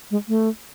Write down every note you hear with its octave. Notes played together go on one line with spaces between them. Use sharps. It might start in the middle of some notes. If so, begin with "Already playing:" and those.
G#3
A3